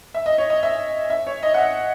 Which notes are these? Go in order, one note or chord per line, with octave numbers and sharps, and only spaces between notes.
E5
D#5
C#5
D#5
E5
E5
C#5
D#5
F#5
E5